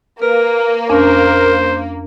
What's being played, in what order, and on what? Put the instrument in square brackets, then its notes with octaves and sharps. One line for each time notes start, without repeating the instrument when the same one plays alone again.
[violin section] A#3 [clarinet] A#4 [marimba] B4
[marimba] F2 C#4 D4 [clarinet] A#4 [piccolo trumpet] C5